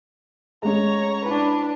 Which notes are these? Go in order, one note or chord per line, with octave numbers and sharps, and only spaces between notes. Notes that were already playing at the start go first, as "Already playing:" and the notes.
G#3 A3 C#4 C#5 A#5
D4 E4 B4